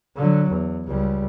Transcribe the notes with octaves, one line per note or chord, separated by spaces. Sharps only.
D3 F#3
E2
C#2 G3